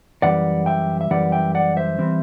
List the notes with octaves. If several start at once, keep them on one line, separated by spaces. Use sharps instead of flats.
F#2 E3 G3 D5 F#5
E5 G5
E5
F#2 E3 G3 D5 F#5
E5 G5
D5 F#5
C5 E5
E3 G3 C4